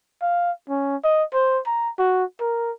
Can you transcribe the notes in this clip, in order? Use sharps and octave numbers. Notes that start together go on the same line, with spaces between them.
F5
C#4
D#5
C5
A#5
F#4
A#4